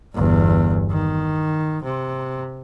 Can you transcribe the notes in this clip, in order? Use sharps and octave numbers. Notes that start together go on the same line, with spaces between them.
G1 E2
D#3
C3